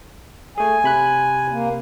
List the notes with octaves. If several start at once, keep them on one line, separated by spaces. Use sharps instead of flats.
A3 G#4 G#5
C3 B5 F#6
A#3